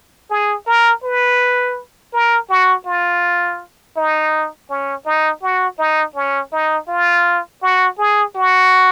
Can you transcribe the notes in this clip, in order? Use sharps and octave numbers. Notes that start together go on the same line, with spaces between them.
G#4
A#4
B4
A#4
F#4
F4
D#4
C#4
D#4
F#4
D#4
C#4
D#4
F4
F#4
G#4
F#4